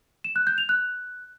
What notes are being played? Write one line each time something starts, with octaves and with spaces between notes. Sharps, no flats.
E7
F#6
G6
F7
F#6